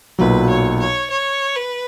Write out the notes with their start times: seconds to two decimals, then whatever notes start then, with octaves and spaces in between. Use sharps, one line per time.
0.19 B1 A#2 F#3 B4
0.50 C#5
0.80 C#5
1.10 C#5
1.56 B4